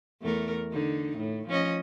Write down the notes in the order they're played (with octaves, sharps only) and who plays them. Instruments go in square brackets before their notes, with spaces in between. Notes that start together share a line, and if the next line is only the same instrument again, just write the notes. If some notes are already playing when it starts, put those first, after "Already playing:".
[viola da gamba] E2 A3 A#4
D3 D#4
A2
F3 C#4 D#5